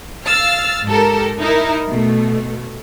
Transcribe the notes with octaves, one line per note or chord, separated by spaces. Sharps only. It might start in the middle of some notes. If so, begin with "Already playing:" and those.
F5 E6 F6 A6
G#2 G4 A4 A#4
D#4 E4 A#4
B2 A3